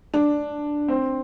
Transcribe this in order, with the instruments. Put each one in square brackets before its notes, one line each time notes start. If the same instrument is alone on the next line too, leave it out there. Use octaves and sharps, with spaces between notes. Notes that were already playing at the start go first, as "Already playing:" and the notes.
[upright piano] D4
C4